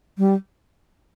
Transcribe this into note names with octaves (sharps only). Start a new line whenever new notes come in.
G3